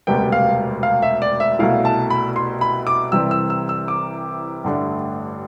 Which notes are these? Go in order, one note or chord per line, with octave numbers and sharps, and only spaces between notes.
E1 D2 C3 G3 B3 G5
F5
F5
E5
D5
E5
C2 B2 A3 E4 F5
A5
B5
C6
B5
D6
C2 C3 E3 G3 C4 E6
E6
E6
E6
D6
A1 G2 D3 A3 D4